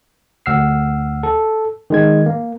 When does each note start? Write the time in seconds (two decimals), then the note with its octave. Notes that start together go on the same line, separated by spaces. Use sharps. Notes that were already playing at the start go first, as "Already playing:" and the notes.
0.46 D2 F#5 E6 F6 C7
1.23 A4
1.90 D#3 G#3 G#6
2.26 A#3